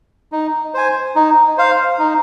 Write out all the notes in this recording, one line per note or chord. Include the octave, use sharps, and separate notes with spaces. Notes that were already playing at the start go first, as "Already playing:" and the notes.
D#4
C5 G#5
D#4
C5 F5
D#4